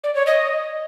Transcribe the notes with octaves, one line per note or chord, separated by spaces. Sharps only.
D5
C#5
D#5